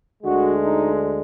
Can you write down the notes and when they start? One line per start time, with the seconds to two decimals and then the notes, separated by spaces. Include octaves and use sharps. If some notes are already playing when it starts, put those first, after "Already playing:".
0.23 D2 D3 G#3 F#4
0.63 D#4